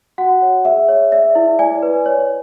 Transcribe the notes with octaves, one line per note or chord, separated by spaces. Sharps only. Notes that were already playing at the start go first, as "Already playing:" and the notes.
F#4 F#5
C#5
G#4 E5
C#5
D5 E5
E4
D5 G#5
B4
C#5